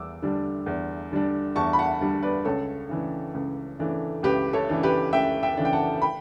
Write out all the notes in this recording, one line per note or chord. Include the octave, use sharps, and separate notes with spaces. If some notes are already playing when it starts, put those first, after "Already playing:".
Already playing: E2 G3 D6 E6
D3 G3 D4
E2
D3 G3 D4
E2 A5 C#6
B5
F#5 A5
D3 G3 D4
B4 D5
C#2 A4 C#5
C#3 E3 A3 D4
C#2
C#3 E3 A3 D4
C#2 G4 B4
A4 C#5
C#3 E3 A3 D4
G4 B4
C#2 E5 G5
E5 G5
C#3 E3 A3 D4
G5
F#5 A5
G5 B5